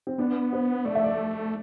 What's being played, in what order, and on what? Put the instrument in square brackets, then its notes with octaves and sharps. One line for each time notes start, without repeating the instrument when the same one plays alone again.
[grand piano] C4
[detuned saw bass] B3 [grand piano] D4
[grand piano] C5
[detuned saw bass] A3 [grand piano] D5
[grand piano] E5
D5